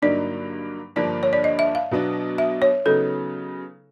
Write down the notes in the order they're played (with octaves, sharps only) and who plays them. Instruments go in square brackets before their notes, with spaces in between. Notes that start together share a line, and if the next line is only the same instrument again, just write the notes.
[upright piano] G2 D3 F#3 A#3 D#4 [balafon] D5
[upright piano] G2 D3 F3 A#3 D4 [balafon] D5
[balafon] C#5
D5
D#5
E5
F5
[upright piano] B2 F#3 B3 D4
[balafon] E5
C#5
[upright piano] C#3 F#3 B3 D#4 [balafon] A4